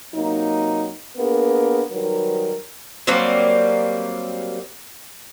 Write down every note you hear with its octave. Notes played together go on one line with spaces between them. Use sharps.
C3 F#3 A#3 D#4
A#3 B3 D4 G#4 A#4
D#3 F#3 G3 D#4 A#4 B4
F#3 G3 A#3 C4